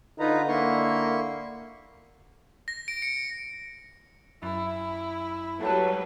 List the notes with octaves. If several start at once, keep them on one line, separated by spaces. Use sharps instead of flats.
D3 D#4 F4 B4 A#5
A#3 E4 C6 C#6
A#6
D7
C#7
F#2 E4
F#3 G3 A4 B4 F#5 A5